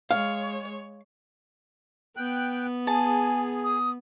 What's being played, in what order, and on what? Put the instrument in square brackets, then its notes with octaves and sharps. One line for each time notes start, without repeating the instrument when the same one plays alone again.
[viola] G#3 C#5 [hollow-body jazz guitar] F5
[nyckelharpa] B3 [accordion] G5 F#6
[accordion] G#4 [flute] G#5 [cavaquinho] A5
[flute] D#6